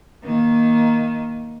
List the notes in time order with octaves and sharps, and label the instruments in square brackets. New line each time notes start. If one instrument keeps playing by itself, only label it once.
[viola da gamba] D#3 A#3